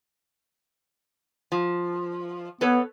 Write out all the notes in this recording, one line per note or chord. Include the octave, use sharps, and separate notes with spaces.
F3
B3 A4 B4 C#5